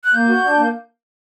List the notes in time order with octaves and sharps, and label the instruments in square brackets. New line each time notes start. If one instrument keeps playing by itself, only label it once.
[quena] F#6
[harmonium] A#3 [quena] G6
[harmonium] F#4
D4
A#3